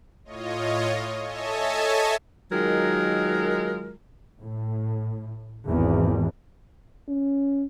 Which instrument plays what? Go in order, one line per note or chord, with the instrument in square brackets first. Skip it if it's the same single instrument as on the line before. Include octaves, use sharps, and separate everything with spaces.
[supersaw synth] A2 F4 C#5 D#5
A4 C#5 D#5 E5 G#5 A5
[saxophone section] D#3 F#3 G#3 F4 A#4
[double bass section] A2
G#1 E2
[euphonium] C#4